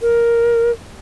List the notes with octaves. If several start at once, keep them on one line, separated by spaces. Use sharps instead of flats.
A#4